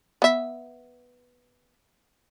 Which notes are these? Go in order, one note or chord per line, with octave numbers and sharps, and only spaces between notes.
B3 E5